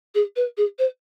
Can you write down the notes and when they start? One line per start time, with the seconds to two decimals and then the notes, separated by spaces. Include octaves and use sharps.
0.15 G#4
0.36 B4
0.57 G#4
0.79 C5